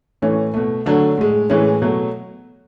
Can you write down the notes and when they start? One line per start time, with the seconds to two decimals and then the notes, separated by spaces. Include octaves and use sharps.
0.22 A2 E3 A3 C#4
0.54 B2 A3
0.86 D3 F#3 A3 D4
1.18 A2 G#3
1.50 A2 E3 G#3 C#4
1.82 B2 F#3 A3